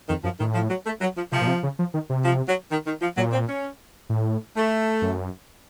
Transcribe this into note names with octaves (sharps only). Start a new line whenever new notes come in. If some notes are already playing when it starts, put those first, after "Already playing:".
F2 D#3
F#2 F3
A2 D#3
F3
F#3
A3
F#3
F3
C3 F3
A#2
C3
C#3
F3
D#3
C3
F3
F#3
D#3
D#3
F3
A#2 F#3
C4
C#4
A2
A3
F#2